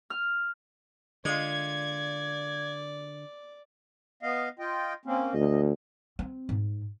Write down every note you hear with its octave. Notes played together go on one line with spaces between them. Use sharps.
F6
D3 G#3 F4 D5 G#6
B3 D#5 F5
F4 D#5 G5
A#3 C4 C#4
D2 D#5
C4
G#2